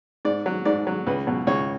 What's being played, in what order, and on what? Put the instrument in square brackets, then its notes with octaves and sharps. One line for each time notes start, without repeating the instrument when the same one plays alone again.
[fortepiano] G#2 D5
F#3
G#2 D5
F#3
C#2 B4
B2 F#3
C#2 C#5